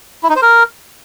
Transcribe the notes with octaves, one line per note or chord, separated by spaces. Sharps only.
E4
D#4
C5
A#4